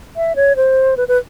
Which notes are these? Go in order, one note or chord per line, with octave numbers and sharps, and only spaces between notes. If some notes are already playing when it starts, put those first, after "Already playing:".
E5
C#5
C5
B4
B4